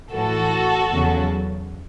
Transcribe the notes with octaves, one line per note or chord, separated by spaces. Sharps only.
A2 E3 F#4 A4
E2 C#3 F#3